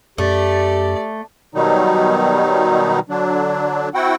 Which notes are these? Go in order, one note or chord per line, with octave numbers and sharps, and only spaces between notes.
F#2 A3 G4 D5
B2 D#3 F#3 G3 D#4
D3 F#3 D4
C4 E4 F#4 F#5 G5